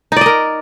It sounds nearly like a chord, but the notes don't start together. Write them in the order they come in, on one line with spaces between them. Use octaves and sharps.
D#4 D5 D#5 A#4